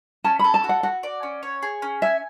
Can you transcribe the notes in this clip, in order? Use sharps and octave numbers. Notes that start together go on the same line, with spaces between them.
C#4 A5
A4 B5
A5
F#4
F#5
F#4 F#5
D5
C#4
C#5
G#4
C#4
E5 G#5